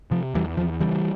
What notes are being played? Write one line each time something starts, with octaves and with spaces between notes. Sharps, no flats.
C3 F3
E2 E3 G3
E2 F3
C#3 E3 G3